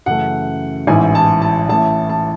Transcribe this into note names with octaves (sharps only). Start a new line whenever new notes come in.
F#2 C#3 E3 A3 F#5
A1 G#2 E3 G#5
A5
A5
A1 A2 E3 A5
A5